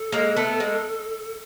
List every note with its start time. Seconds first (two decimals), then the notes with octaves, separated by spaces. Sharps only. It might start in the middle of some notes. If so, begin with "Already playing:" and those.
Already playing: A4
0.12 G#3 A#3
0.36 A3 B3
0.60 G#3 A#3